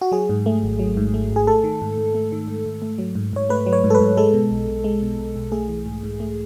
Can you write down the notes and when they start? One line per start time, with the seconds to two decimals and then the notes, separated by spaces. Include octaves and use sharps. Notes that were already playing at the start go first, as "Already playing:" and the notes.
0.01 F#4
0.12 F#3 G#4
0.29 G#2
0.46 A3
0.63 G#1
0.79 F#3
0.97 G#2
1.14 A3
1.31 G#1
1.36 G#4
1.47 A3 A4
1.64 D#3
1.82 G#2
1.98 G#2
2.15 A3
2.32 D#3
2.48 G#2
2.66 G#2
2.82 A3
2.98 F#3
3.15 G#2
3.33 G#2 C#5
3.49 A3 B4
3.66 F#3
3.73 C#5
3.84 G#2
3.90 A4
3.95 B4
4.00 G#2
4.17 G#3 A4
4.33 B2
4.51 B1
4.68 B1
4.84 G#3
5.02 B2
5.19 B1
5.36 B1
5.52 A3 G#4
5.69 E3
5.86 G#2
6.03 G#2
6.20 A3